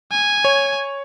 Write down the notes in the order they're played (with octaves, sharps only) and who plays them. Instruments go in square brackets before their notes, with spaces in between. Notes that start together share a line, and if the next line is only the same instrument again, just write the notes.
[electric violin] G#5
[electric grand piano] C#5